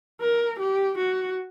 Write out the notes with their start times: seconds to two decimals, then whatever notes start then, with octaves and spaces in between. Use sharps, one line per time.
0.21 A#4
0.59 G4
0.97 F#4